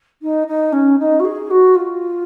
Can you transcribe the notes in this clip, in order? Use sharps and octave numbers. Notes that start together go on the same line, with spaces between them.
D#4
D#4
C#4
D#4
F#4
G#4
F#4
F4